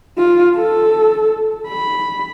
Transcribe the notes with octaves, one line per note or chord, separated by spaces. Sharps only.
F4
A4
B5